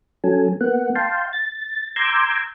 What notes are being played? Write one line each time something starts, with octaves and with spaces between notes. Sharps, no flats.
F#3 C#4 A4 G#5
A#3 B3 F#5
F5 G5 A5 C6
A6
A#5 C6 D6 E6 G6 G#6